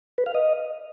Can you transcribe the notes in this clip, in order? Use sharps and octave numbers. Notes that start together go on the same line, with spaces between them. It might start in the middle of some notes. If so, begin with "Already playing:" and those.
B4
F5
D#5